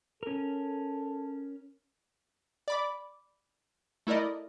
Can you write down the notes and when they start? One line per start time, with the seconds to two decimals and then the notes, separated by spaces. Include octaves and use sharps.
0.23 C#4 A4 A#4
2.68 D5 B5 D6
4.07 A3 E4 A#4 D5 D#5